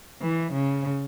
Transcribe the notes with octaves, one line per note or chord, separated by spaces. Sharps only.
E3
C#3